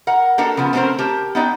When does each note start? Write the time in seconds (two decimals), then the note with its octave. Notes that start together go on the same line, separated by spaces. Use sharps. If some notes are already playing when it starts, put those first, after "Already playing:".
0.07 A#4 F#5
0.38 A#3 D4 F#4 A4 A#4 F#5
0.57 C#3 F3 B3
0.73 A3 C4 C#4 G#4 A#4 C5
0.98 G4 A#4 A5
1.35 B3 D#4 D5 G5